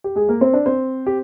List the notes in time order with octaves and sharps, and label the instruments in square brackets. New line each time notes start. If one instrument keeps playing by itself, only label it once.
[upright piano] G4
G#3 G#4
A#3 A#4
C4 C5
D4 D5
C4 C5
G4